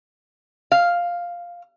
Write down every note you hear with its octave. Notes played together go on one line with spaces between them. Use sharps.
F5